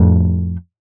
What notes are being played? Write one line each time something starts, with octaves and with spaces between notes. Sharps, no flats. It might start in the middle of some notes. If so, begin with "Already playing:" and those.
Already playing: F2 A2